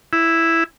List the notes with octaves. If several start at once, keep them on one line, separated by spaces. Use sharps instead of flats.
E4